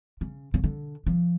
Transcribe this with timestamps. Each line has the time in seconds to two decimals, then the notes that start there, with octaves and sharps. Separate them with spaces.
0.21 C#3
0.54 C#3
0.64 D3
1.07 F3